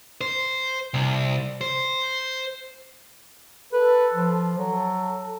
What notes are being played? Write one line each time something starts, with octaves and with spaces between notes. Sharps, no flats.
C5
C2
C5
A4 B4
F3
F#3 A4